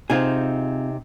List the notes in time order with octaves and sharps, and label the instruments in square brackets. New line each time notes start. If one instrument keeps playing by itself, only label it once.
[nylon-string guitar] C3 D#4 [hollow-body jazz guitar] C4 F4 G#4